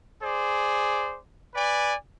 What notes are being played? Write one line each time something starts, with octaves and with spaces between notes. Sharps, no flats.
G#4 C5 D5
B4 D5 G#5